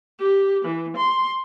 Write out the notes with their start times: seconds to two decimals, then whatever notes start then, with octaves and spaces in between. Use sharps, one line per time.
0.20 G4
0.64 E3
0.96 C6